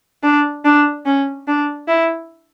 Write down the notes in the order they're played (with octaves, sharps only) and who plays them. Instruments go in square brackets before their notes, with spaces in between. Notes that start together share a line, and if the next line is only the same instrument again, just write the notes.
[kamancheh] D4
D4
C#4
D4
E4